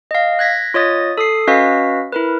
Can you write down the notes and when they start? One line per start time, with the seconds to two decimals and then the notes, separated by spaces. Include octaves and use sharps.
0.11 D#5 F5
0.39 F#6 G#6 A#6 B6
0.74 F4 C#5 D#5 D#6 A6
1.18 A4 D#6 C7
1.47 C#4 F#4 B4 D#5 F5 B6
2.12 E4 A#4 B4